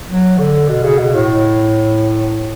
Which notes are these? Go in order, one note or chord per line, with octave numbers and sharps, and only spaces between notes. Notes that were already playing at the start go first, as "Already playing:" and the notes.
F#3
D3
B2
C#3
B2
A2